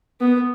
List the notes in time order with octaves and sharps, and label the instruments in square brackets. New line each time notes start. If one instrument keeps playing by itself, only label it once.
[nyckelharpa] B3